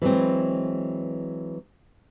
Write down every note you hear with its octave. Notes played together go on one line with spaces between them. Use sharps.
E3 F#3 G#3 C4